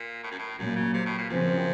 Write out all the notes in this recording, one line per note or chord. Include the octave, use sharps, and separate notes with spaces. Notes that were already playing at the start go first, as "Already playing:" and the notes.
Already playing: A#2
A2
F#2
A2
F#2 A#2 F#3 A#3
C#3
C3
A2
A#2
F#2 C#3 F3 C4